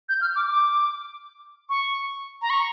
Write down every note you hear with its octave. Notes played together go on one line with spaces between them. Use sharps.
G6
F6
D6
D6
C#6
A#5
C#6